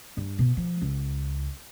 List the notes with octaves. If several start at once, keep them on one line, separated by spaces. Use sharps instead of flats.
G2
B2
F3
C#2